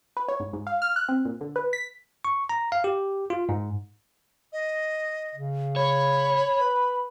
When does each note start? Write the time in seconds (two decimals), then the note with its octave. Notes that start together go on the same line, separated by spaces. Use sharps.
0.17 B4
0.28 C#5
0.40 G#2
0.53 G#2
0.67 F5
0.82 F6
0.96 F#6
1.09 C4
1.25 A#2
1.41 D3
1.56 B4
1.73 B6
2.25 C#6
2.49 A#5
2.72 F5
2.84 G4
3.30 F4
3.49 G#2
4.53 D#5
5.35 C#3
5.76 C#5 B5
6.60 B4